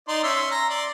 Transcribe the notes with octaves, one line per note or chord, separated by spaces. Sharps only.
D#4 D5 C6
C#4 E5 C6
A#5
D5 C6